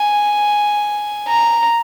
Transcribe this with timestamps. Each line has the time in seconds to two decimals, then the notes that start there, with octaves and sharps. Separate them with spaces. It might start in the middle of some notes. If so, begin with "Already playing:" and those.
Already playing: G#5
1.28 A#5